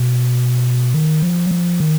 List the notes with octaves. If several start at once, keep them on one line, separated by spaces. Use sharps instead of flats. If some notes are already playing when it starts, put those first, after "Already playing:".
Already playing: B2
D#3
F3
F#3
F3
D#3